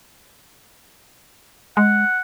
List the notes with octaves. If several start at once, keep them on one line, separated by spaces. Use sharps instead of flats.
G#3 F#5